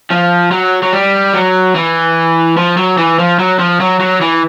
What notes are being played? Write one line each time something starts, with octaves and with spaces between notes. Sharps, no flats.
F3
F#3
F#3
G3
F#3
E3
F3
F#3
E3
F3
F#3
F3
F#3
F#3
E3